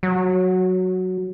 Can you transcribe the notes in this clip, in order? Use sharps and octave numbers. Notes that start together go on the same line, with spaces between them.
F#3